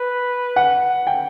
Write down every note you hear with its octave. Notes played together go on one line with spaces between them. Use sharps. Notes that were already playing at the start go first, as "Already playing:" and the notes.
Already playing: B4
F#5
G5